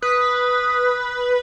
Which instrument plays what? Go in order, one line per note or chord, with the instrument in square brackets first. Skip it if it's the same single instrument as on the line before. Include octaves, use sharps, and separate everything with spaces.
[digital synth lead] B4 [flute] D#6